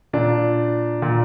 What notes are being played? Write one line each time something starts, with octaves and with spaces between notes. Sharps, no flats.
A#2 D4
A#2